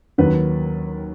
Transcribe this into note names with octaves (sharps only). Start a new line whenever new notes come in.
D#2 D#3 F#3 B4